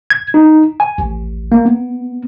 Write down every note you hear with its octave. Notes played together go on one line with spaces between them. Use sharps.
G#6
D#4
G#5
A1
A#3
B3